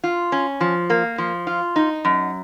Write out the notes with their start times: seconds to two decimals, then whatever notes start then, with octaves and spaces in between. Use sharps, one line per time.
0.04 F4
0.32 C#4
0.61 F3
0.90 A#3
1.18 F3
1.47 F4
1.76 D#4
2.05 F#2